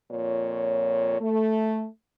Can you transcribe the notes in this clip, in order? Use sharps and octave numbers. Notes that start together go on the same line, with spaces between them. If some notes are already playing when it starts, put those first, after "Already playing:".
F2 A#2 C#5
A3